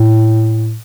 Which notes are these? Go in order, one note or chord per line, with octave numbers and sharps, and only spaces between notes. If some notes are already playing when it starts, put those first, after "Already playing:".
Already playing: A2